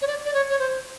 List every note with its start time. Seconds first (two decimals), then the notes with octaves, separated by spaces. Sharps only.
0.02 C#5
0.07 D5
0.25 D5
0.34 C#5
0.50 C#5
0.59 C5